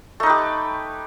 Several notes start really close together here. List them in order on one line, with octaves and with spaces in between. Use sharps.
A3 D#4 B4 G4